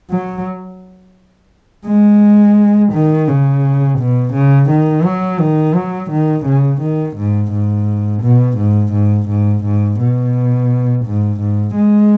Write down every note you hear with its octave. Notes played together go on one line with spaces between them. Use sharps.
F#3
G#3
D#3
C#3
B2
C#3
D#3
F#3
D#3
F#3
D#3
C#3
D#3
G#2
G#2
B2
G#2
G#2
G#2
G#2
B2
G#2
G#2
G#3